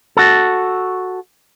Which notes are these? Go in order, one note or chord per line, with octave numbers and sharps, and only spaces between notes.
F#4 A4